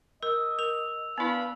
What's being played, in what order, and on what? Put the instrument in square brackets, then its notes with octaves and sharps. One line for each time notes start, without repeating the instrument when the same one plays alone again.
[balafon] A#4 [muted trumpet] D#5 [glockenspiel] E6
[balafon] A#4 [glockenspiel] F7
[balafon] B3 E4 [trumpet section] D4 F5 B5 [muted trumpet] B4